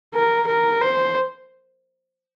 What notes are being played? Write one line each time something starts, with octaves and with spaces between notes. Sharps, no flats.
A#4
A#4
C5